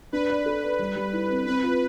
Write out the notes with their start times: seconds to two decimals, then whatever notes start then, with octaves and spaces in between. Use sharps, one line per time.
0.12 D4 B4
0.29 D5
0.46 A4
0.63 D5
0.79 G3
0.96 G3
1.13 E4
1.29 C4
1.47 C4 B4
1.63 F4